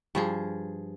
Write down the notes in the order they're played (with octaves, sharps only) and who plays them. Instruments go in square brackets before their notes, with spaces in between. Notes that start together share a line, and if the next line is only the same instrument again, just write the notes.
[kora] G2 F3 G#4